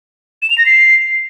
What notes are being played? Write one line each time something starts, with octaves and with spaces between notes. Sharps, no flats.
E7
F7
A#6
C7